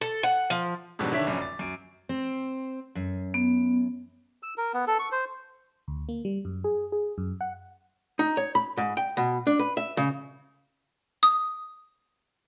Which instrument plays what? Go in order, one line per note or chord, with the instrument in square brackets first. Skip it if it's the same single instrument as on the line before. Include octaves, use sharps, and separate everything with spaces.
[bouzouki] A4
F#5
F3
[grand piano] F2 G#2 B2 D3 F#3 G3
D3 D#3 D4 C#5 E5 B6
F1 A#1 F#2 C#4 D6
A6
F#2 D7
[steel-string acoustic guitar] C4
F#2
[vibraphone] B3
[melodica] E6
A#4
B3
A4
C#6
C5
[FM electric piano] D2
A#3
G3
F#2
G#4
G#4
F#2
F#5
[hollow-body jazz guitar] D#4
C#5
B5
G#2
G5
B2
D4
B4
E5
C#3
[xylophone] D#6